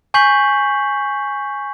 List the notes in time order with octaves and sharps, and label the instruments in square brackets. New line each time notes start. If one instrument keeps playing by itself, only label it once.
[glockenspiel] G#5 C#6 G6 B6 C7 F#7